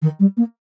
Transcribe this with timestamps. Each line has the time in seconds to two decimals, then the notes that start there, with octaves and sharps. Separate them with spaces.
0.02 D#3
0.20 G3
0.37 A#3